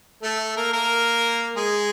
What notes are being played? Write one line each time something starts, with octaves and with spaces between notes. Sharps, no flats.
A3 A4
A#3 A#4
A#3 A#4
G#3 G#4